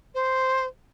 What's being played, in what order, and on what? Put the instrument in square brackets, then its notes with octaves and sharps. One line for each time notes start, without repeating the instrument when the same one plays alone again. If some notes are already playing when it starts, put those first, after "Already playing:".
[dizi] C5